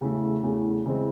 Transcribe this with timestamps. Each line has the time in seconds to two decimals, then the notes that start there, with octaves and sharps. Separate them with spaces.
0.01 E2 C#3 E3 A3
0.43 E2 C#3 E3 A3
0.86 C#3 E3 G#3 C4